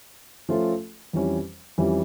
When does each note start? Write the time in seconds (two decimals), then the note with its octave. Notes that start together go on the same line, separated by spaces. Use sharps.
0.49 F3 A3 C#4 F4 A4
1.13 F2 E3 G3 C#4
1.78 F2 E3 G3 C#4